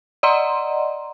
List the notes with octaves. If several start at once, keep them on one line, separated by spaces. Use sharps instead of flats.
D5 D#5 F#5 A#5 C6